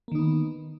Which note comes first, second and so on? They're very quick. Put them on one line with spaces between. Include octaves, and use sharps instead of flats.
A#3 D#3 D#4 B3